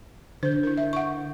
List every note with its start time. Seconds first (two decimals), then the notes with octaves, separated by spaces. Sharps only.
0.43 D3 C5 G6
0.63 E4 A#4
0.77 E5
0.93 F#5 C#6